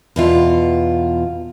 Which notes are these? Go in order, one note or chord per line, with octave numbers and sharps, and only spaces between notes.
E2 B2 F4